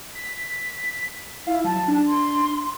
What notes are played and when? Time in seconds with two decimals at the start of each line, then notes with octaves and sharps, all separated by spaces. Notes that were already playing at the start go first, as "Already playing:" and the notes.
0.15 B6
1.47 E4 F5
1.64 F#3 A5
1.88 D4
2.08 C6